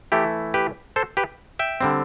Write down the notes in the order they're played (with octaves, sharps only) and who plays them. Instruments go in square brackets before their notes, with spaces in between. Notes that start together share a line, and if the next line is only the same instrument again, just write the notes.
[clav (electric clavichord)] E3 A3 E4 G4
G4 B4
A4 C5
G4 B4
E5 G5
D3 G3 C4